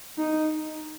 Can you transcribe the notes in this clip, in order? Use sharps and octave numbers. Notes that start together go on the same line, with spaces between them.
D#4